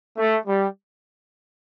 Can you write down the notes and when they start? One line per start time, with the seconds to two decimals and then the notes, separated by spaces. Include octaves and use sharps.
0.18 A3
0.46 G3